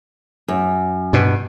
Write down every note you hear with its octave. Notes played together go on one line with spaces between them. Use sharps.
F#2
G2 B2